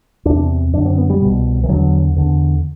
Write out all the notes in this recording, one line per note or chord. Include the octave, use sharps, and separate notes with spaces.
E2 C3 D4
F#2 D3 D4
C4
B3
G3
C2 B2
E3
E2 D3 F#3
E2 D3